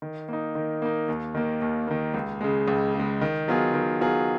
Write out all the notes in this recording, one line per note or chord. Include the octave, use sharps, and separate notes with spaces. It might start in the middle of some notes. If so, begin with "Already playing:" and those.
D#3
A#3 D#4
D#3
A#3 D#4
D#2
D#3 A#3
D#2
D#3 A#3
C#2
C#3 G#3
C#2
C#3 G#3
D#3
F#3 B3 F4 G#4
D#3
F#3 B3 F4 G#4